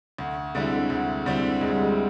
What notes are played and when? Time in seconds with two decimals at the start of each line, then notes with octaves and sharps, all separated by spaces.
0.18 D2
0.55 D3 G3 G#3 C4 E4
0.66 A3
0.77 G#3
0.90 D2
1.26 D3 G3 C4 E4
1.61 D2 G#3
1.73 G3
1.83 G#3